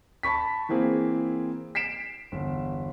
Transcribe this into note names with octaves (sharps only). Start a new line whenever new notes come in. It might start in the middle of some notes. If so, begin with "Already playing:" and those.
A5 B5 C#6 B6
E3 A#3 C4 G#4
B6 C7 D7 E7
G1 E2